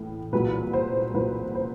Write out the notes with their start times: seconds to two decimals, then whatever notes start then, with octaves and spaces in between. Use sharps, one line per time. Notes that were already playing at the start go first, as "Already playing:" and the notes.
Already playing: A2 E3
0.33 C2 A#2 F#3 B4
0.73 C5
1.14 C2 A#2 F#3 B4
1.55 C5